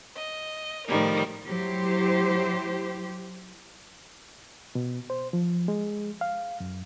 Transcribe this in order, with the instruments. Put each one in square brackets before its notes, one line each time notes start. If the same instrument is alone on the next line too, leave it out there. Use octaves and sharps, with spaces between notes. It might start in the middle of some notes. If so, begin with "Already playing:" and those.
[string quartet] D#5
A2 D#3 F3 G3 A#4
[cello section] F#3 E4 G4 C5
[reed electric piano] B2
C5
F3
G#3
F5
F#2